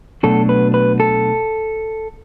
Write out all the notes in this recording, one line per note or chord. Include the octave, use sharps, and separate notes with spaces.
B2 F#3 A3 D4 A4
B4
B4
A4